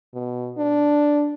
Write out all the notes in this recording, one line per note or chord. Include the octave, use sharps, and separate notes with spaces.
B2
D4